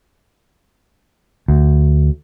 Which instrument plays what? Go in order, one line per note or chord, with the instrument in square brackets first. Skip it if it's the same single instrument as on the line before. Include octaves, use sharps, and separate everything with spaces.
[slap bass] D2